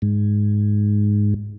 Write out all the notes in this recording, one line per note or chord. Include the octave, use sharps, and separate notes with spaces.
G#2